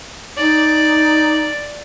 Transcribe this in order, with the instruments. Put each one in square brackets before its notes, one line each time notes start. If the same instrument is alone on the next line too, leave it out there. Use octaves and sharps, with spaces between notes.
[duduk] D#4 [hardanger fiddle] D5